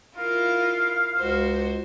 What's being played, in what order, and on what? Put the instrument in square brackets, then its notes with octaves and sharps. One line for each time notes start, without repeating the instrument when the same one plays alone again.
[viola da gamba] E4 F4 A#4 [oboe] F5
[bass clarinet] C#2 [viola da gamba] F#4 C5